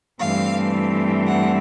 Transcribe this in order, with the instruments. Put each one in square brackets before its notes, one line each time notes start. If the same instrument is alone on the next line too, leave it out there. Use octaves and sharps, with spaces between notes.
[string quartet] G2 E3 A3 C4 F5
F#5